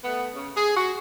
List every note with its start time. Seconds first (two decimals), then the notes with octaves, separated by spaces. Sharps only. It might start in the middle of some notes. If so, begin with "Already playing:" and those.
0.03 A3 B3
0.35 C#3
0.56 G#4
0.76 F#4